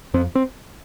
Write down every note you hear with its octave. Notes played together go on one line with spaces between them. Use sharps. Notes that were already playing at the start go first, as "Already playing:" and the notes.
F2 C4
C4